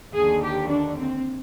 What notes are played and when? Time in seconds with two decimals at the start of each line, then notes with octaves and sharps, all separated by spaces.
0.15 D#2 D3 G#4
0.43 G4
0.71 D4
0.99 C4